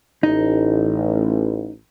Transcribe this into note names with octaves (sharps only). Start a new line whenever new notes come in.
A1 D#4